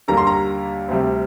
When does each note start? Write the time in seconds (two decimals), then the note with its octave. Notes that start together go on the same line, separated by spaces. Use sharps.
0.08 D#2 D3 G3 A#3 A#5
0.17 C6
0.27 A#5
0.88 D2 C3 G3